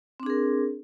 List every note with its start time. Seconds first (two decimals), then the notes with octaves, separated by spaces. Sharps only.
0.20 C4
0.23 D4
0.26 G#4
0.30 A#4